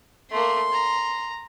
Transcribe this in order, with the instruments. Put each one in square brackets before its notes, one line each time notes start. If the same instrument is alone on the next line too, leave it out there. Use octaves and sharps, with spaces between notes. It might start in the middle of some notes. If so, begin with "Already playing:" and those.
[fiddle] A3 A#3 [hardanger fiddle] C6
[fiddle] A#5